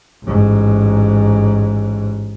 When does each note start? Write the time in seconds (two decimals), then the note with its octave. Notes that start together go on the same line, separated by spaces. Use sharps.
0.24 A1 G#2